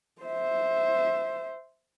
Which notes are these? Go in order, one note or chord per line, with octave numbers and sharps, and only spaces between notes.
C5 E5